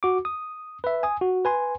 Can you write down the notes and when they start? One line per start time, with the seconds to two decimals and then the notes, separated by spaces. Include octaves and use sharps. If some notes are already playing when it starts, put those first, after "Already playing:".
0.03 F#4 D6
0.25 D#6
0.84 B4 E5
1.03 G#5 D#6
1.21 F#4
1.45 B4 G#5 C6